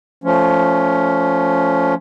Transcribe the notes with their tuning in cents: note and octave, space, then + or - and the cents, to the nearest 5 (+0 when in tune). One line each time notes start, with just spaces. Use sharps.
F3 +0 A3 +10 C#4 +15